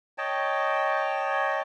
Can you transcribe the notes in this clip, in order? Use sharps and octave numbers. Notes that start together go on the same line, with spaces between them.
C#5 D#5 G5 A5